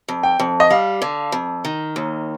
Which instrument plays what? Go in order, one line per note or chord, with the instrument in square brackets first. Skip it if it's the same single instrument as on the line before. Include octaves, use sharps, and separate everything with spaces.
[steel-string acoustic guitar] F2
[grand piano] G5
[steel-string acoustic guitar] F2
[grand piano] D#5
[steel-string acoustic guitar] G3 [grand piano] F5
[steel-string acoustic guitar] D3
F2
D#3
D#2